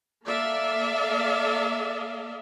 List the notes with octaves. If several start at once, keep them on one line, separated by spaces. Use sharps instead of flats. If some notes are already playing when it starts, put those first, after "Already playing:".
A#3 A4 D5 E5 F5